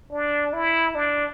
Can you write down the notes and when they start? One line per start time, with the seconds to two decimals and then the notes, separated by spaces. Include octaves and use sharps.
0.12 D4
0.53 E4
0.95 D4